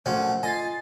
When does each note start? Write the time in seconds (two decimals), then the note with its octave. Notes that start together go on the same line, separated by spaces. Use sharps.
0.06 A#1 F#3 A3 C#4
0.43 F4 D#5 G#5 A6 C7